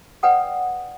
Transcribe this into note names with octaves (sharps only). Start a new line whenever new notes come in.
B4 D5 F#5 G5 D#6